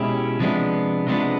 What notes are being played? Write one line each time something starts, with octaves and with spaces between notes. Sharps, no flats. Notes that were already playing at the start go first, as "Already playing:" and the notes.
Already playing: B2 G#3 C#4 E4 G4
C3 F3 G#3 B3 D4
C3 F3 G#3 B3 D4